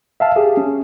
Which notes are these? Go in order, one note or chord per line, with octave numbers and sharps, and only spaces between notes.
E5 F5 A5
G4 G#4
C#4